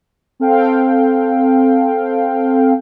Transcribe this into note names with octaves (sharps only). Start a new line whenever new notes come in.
C4 A4 F5 G5